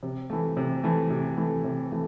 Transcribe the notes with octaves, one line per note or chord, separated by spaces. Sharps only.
C3
E3 A3
C3
E3 A3
C3
E3 A3
C3
E3 A3